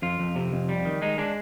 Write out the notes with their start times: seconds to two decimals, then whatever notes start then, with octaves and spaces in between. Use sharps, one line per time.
0.02 F2 F4
0.20 F2
0.36 C3
0.53 F2
0.69 G3
0.85 D#3
1.02 G#3 D#4
1.18 G#3 D4